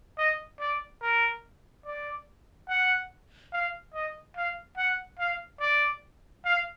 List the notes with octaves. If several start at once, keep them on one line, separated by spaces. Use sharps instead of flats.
D#5
D5
A#4
D5
F#5
F5
D#5
F5
F#5
F5
D5
F5